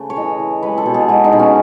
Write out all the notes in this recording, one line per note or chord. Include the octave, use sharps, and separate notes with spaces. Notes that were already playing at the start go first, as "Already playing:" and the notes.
Already playing: C#3 A3 B4
C#5
E3 D#5
E3
G#3 B4
A4
B2
G#4
G#3 F#4
D#4
B2
C#4